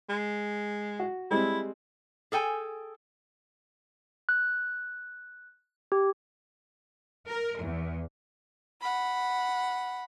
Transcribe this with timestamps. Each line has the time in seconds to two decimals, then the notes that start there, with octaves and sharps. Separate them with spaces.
0.09 G#3
0.99 F#4
1.31 G3 G#3 C4 E4
2.32 G#4 A4 G5 G#5
4.29 F#6
5.92 G4
7.28 A#4
7.61 E2
8.81 F#5 B5